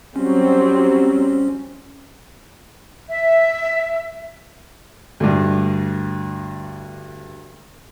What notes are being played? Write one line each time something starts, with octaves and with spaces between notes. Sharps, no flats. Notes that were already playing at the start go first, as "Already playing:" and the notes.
F#3 G3 C4 C#4
E5
D2 G2